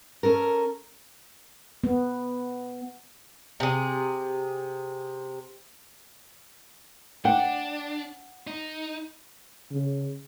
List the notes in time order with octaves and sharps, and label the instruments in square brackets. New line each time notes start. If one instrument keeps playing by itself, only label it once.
[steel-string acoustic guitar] C#4 A4 A#4
[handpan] B3
[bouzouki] C3 G#4
[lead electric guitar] D4 [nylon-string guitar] F#5 [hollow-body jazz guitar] G5
[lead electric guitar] D#4
[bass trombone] C#3